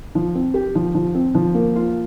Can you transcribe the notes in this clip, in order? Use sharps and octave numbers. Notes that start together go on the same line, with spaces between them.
F3
C4
G4
F3
F3
C4
F3
A#3
F4